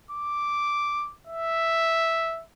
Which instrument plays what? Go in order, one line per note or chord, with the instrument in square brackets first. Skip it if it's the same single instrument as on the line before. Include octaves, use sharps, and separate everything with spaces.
[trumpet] D6
E5